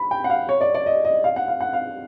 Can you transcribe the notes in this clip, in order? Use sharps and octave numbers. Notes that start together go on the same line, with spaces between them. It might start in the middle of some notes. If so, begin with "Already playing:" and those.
Already playing: B5
G5
F#5
F5
C#5
D5
D5
D#5
D#5
F5
F#5
F5
F#5
F5